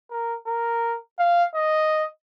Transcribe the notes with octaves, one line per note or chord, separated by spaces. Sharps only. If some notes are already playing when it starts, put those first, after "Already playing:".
A#4
A#4
F5
D#5